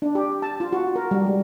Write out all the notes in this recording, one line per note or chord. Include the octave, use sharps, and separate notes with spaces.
D4
G4
A5
F4
F#4
A#4
G3
G#3